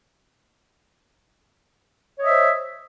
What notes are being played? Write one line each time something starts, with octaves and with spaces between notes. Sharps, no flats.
C5 C#5 D#5 E5